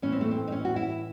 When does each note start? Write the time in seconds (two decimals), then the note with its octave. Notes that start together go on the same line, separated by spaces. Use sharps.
0.02 A2 E3 C#4
0.12 C4
0.21 A3
0.31 C4
0.48 D#4
0.52 C#4
0.65 F#4
0.76 E4